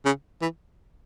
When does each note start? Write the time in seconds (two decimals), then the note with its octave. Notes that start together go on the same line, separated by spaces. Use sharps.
0.05 C#3
0.42 E3